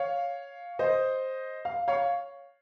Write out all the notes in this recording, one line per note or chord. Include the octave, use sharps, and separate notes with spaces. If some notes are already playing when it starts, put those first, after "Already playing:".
Already playing: C#5 F5
C5 D#5
F5
C#5 F5